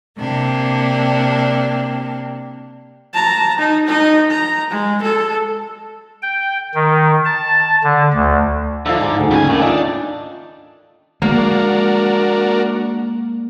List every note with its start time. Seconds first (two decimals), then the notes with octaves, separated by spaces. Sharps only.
0.17 C3 A#3 D4 G4
3.14 A5 A#5
3.59 D#4
3.87 D#4 D#5
4.31 A#5
4.70 G#3
5.02 A4
6.22 G5
6.75 D#3
7.25 A5
7.84 D3
8.14 D2
8.86 D3 F3 D#4 E4 A4 F5
9.01 G#2 G#5 A#5 D6
9.17 D2 G#2 D#4 A4 F5 F#5
9.31 C#3 G3 A#3 C#4 A4 G#5
9.49 A2 D#3 D4 A#4 F5 D6
9.62 D4 D#4 F4 E5 G5
11.22 G#3 A#3 D4 F#4 A#4